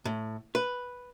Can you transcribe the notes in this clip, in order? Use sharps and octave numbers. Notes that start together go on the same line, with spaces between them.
A2
B4